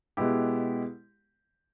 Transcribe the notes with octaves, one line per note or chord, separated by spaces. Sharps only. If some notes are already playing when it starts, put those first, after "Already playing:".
B2 G#3 B3 E4 G4